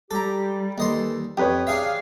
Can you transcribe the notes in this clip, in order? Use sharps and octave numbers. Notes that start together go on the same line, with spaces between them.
G3 G4 A4 A#5
D#2 E3 G4 A4 D#5 C6
F2 E3 B3 G4 B4 C#5 D#6
D4 G#4 E5 F5